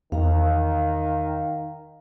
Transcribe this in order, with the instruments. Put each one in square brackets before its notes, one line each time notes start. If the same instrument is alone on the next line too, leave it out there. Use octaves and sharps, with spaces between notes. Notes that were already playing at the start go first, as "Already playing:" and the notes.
[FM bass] E2 [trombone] D#3 [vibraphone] F5 A#5